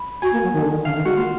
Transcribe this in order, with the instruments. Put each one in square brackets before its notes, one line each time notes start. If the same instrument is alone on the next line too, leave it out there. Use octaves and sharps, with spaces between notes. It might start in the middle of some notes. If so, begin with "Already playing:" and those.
Already playing: [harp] B5
[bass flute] F#4 [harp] G#5
[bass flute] A#3
F#3
D#3
D3
D#3
[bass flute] D3 [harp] F5
[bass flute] D#3 [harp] F5
[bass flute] G#3 [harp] F#4
[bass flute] A#3 [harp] F4